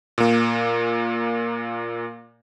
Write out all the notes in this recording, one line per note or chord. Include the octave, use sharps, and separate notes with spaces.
A#2 A#3